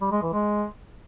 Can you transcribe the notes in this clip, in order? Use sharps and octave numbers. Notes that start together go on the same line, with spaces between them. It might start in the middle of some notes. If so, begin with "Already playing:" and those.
G3
G#3
E3
G#3